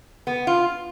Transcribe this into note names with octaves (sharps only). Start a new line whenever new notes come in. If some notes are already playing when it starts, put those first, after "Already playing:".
B3
F4